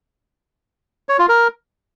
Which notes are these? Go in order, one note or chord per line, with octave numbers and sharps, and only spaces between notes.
C#5
F4
A#4